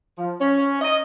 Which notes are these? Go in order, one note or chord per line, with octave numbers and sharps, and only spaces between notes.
F3
C#4
D#5